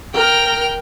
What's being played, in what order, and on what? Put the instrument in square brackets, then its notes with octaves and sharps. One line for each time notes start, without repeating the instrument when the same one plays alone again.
[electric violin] A#4 [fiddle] G5 F6